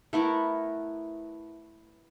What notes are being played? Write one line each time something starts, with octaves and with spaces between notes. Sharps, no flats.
A3 B3 E4 A#4